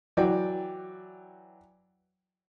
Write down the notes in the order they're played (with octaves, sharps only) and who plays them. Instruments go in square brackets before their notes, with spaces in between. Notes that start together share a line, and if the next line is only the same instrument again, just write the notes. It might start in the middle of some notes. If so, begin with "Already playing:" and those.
[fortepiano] E3 F#3 D5 G5